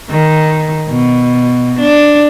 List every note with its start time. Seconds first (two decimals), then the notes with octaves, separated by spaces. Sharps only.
0.11 D#3
0.89 B2
1.80 D4